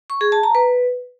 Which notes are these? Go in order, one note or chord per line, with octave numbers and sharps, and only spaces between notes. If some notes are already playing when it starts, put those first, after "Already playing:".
C#6
G#4
A5
A#5
B4